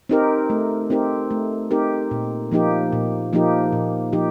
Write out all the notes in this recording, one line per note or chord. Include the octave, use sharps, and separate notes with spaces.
C4 D#4 G4 A#4
A3
C4 D#4 G4 A#4
A3
C4 D#4 G4 A#4
A#2
F3 A#3 D#4 G4
A#2
F3 A#3 D#4 G4
A#2
F3 A#3 D#4 G4